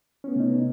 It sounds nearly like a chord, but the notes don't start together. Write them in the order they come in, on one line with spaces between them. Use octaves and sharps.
C#4 B3 A3 C3 D#4